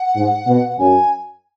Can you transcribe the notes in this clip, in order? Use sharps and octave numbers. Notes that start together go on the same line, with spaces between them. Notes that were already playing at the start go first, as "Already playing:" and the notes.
Already playing: F#5
G#2
B2
F#5
F#2 G#5